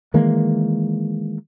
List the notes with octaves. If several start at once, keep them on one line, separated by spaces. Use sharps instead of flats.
D#3 E3 G#3 A#3